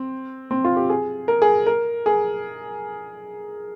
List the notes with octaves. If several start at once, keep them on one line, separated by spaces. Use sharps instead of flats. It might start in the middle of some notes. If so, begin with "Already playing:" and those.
Already playing: C4
C4
F4
G4
G#4
A#4
G#4
A#4
G#4